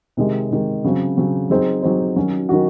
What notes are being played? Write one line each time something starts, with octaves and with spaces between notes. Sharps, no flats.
C3 D#3 G#3
C3 D#3 G#3
C#3 F#3 C4
C#3 F#3 C4
F#3 C4 D#4 G#4 C5
F#3 C4 D#4 G#4 C5
D#3 F#3 C#4 F#4
D#3 F#3 C#4 F#4